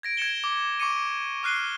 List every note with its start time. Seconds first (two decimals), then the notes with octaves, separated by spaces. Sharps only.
0.03 G#6 A#6 D7
0.17 G#6 A#6 C#7 E7 G7
0.44 D6
0.80 C#6 D6 C#7 D#7
1.43 D6 F6 F#6 C7 D#7 G7